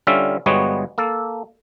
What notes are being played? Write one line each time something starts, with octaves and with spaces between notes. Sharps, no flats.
D3 G3 C#4 F4 E5
G1 G3 G#3 B3 F#4 C#5
A#3 A4